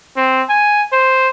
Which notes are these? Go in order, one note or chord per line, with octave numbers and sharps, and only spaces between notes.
C4
G#5
C5